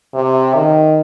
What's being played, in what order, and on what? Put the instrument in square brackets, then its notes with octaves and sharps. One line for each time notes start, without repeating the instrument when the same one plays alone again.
[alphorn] C3
D#3